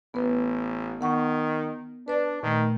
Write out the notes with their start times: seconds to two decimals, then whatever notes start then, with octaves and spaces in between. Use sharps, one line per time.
0.14 A1 B3 B4
1.01 D#3 B3 F#5 C#6
2.08 D4 B4 D5
2.43 A#2 D#3 A3